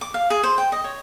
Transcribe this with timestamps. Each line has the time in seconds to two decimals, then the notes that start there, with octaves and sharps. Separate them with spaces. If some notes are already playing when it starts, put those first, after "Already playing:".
0.01 D6
0.14 F5
0.30 G#4
0.43 C5
0.58 G5
0.72 D#5
0.84 C#5